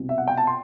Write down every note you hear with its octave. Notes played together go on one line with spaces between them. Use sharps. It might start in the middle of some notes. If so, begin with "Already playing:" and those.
Already playing: C2 B2
E5
F#5
G5
A5
C6